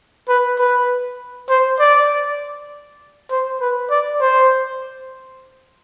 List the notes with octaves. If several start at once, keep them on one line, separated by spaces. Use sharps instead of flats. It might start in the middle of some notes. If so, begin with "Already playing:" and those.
B4
B4
C5
D5
C5
B4
D5
C5